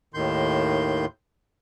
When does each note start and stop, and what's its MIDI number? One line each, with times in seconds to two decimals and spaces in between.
0.14 1.05 39
0.14 1.05 45
0.14 1.05 51
0.14 1.05 84
0.14 1.05 91